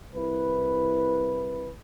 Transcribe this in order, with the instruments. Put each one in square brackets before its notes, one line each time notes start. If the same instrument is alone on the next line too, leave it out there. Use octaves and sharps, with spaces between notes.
[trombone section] C2 E4 B4